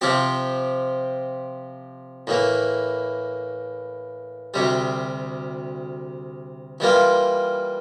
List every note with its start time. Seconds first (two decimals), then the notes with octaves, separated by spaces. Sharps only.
0.01 C3 F3 C4 G4
2.27 A2 E3 A#3
4.54 D2 C3 G3
6.80 E3 G3 A#3 F4